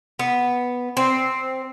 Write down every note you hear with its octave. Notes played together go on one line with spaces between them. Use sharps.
B3
C4